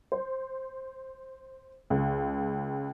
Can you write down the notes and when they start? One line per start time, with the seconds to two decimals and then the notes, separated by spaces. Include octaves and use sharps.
0.12 C5
1.90 C#2